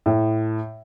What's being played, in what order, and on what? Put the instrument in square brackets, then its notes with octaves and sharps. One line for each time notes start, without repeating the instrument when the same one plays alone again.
[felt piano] A2